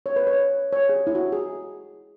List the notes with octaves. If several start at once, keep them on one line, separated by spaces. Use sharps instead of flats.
C#5
B4
C#5
C#5
G#4
E4
F#4
G#4